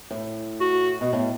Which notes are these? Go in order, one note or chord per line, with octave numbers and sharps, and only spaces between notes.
A2
F#4
B2
A2